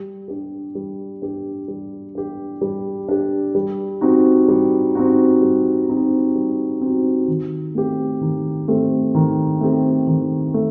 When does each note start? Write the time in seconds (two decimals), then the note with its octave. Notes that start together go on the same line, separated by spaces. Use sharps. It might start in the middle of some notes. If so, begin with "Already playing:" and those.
Already playing: G3
0.28 D4 G4
0.75 G3
1.22 D4 G4
1.68 G3
2.15 D4 G4
2.61 G3
3.08 D4 G4
3.55 G3
4.01 C4 D#4 F#4
4.48 G3
4.95 C4 D#4 F#4
5.42 G3
5.88 C4 D#4 F#4
6.35 G3
6.81 C4 D#4 F#4
7.28 D#3
7.75 A3 C4 G4
8.21 D#3
8.68 A3 C4 G4
9.15 D#3
9.61 A3 C4 G4
10.07 D#3
10.54 A3